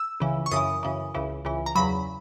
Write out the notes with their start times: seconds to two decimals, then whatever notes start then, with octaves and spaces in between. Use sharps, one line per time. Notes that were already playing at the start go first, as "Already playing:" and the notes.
Already playing: E6
0.20 C#2 C#3 E3
0.46 C#6
0.51 F#2 C#3 E3 D#6
0.83 F#2 C#3 E3
1.14 C#2 C#3 E3
1.45 C#2 C#3 E3
1.66 A#5
1.75 E2 C#3 F#3 B5